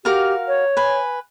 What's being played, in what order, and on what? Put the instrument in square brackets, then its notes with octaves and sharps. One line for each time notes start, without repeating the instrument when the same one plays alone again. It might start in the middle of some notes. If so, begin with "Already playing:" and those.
[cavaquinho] F#4 A#4 F5 [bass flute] G4
[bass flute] C#5
[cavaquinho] B4 G#5